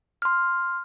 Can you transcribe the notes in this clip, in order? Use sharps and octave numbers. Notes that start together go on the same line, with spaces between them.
C6 F6